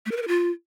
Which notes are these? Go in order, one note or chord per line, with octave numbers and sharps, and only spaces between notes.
A3
A#4
B4
A#4
F4